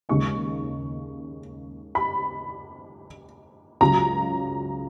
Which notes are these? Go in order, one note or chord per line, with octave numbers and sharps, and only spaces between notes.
D#2 C#3 G#3 D#4 C#6
B5
C#2 C#3 F#3 A#5